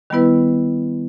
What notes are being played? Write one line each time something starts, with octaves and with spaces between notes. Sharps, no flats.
D#3 G3 B3 E4 B4